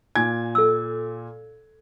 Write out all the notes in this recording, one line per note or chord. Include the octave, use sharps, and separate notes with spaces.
A#2 G#5 G#6
A4 E6